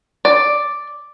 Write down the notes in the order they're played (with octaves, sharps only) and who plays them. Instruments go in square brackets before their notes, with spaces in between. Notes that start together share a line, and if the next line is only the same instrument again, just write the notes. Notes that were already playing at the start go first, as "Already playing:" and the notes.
[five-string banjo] D5